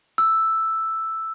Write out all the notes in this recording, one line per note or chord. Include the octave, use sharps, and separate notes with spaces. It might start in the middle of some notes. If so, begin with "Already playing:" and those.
E6